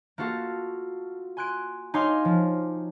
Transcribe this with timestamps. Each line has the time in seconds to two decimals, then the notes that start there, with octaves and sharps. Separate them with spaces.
0.18 A#3 F4 F#4 A4 F5
1.37 G#5 C6 F#6 G#6 D7
1.94 D#4 C#5 F5 G#5 C6 D6
2.25 F3